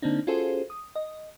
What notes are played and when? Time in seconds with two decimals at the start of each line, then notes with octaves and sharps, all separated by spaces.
0.02 D3 A#3 C4 D4 D#4
0.27 C#4 F4 F#4 G#4 A4 C5
0.70 D#6
0.95 D#5